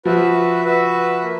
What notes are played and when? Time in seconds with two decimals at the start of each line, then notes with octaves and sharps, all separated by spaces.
0.05 F3 F#4 B4 E5
0.65 F#4 B4 E5
1.23 A#3